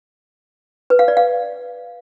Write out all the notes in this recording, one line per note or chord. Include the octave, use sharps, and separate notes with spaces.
B4
F5
D5
F5